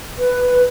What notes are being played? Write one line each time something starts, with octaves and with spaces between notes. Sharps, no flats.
B4